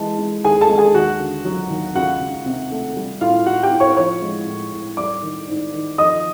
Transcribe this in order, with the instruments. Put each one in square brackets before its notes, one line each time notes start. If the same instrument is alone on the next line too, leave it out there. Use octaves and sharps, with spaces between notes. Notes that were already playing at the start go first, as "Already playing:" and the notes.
Already playing: [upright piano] E3 G#3 A5
G#3
D#2 G#4 G#5
A4 A5
G#3
G#4 G#5
D#2 F#4 F#5
D3
F#3
D#2
C#2 F#4 F#5
C#2
C3
A3
G3
A2 F4 F5
A2 F#4 F#5
G4 G5
A2
C#5 C#6
F3 C#5 C#6
G#3
A2
A2
G3 D5 D6
D#3
G#2
D#3
F3 D#5 D#6